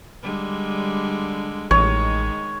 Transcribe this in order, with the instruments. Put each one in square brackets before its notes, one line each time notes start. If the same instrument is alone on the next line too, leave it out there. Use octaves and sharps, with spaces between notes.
[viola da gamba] D3 G3 G#3
[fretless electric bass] A1 [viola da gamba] D#3 G#3 [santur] C#5